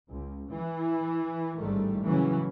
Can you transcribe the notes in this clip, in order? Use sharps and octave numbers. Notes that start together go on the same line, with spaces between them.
C#2
E3
A1 G#2 D#3 G3 A3
A2 C#3 E3 F#3 C#4